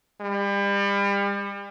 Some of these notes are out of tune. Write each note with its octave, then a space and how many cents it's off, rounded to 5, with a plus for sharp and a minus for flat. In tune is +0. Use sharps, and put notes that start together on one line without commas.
G3 +35